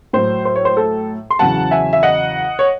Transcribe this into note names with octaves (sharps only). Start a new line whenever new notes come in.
A2 F#3 C5
C5
C#5
C5
A4
C6
E2 C#3 F#3 F#5 A5
E5 G#5
E5
D#5 F#5
C#5